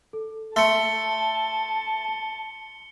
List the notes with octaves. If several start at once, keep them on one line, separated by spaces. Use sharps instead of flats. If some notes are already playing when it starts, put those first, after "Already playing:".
A4
A3 A5 C6 C#7 G7